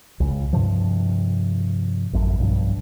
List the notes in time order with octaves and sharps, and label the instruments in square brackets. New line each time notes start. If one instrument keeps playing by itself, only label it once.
[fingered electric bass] C#2 C#3
G2 C3 F3
A1 F#2 A2
B1 G2 F3